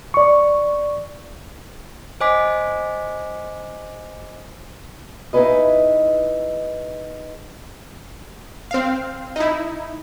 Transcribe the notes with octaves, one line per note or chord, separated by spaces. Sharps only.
D5 C#6
C5 D#5 G#5 D6 B6
D#4 E4 F#4 G#4 B4 D#5
C4 F5
D#4 E4